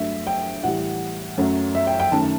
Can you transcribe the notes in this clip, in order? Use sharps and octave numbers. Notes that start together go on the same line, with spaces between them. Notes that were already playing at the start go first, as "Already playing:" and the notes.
Already playing: G2 F#3 A3 E5
G5
A2 E3 G3 F#5
F#2 F#3 A3
E5
G5
G5
F#2 D#3 A3 A5